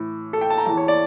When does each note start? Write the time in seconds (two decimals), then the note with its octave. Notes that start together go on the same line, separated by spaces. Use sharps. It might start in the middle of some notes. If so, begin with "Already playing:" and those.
Already playing: A2 E3
0.33 A4
0.41 G5
0.50 A5
0.58 A#5
0.66 E2 E3 A5
0.77 C#5
0.88 D5